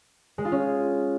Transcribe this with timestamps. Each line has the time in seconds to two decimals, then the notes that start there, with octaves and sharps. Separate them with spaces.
0.38 G#3
0.45 F4
0.52 C#4